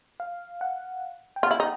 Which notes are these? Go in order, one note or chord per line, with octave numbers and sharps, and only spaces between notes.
F5
F#5
G5
F4 F#5
E4
D#4